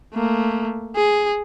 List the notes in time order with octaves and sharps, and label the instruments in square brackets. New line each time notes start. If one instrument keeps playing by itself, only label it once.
[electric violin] A3 A#3
G#4